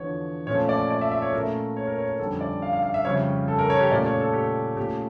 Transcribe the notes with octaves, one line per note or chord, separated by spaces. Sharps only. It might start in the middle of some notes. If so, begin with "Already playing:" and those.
Already playing: E2 D3 F3 C#5
A#2 F3 A3 C#4 C#5
D5
D5
E5
E5
C#5
A#2 A3 C#4 A#4
C#5
A#4
C#5
A#4
F2 D3 G3 C#4 A4
D5
F5
F5
F5
E5
F2 C#3 G3 C#4 C#5
A4
A#4
C#5
G4
A#2 A3 C#4 D5
C#5
A4
G4
A#2 A3 C#4 G4